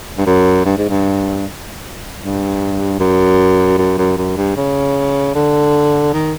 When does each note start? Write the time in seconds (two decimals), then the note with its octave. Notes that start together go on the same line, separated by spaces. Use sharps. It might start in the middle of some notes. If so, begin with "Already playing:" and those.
0.18 G2
0.26 F#2
0.65 G2
0.78 G#2
0.89 G2
2.21 G2
2.99 F#2
3.78 F#2
3.98 F#2
4.17 F#2
4.37 G2
4.57 C#3
5.35 D3
6.13 D#3